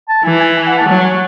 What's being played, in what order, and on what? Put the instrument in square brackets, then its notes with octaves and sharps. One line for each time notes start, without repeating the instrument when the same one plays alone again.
[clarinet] A5
[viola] E3 [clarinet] G#5
[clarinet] G#5
G#5
F#5
A5
[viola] F#3 [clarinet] A5
[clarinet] G#5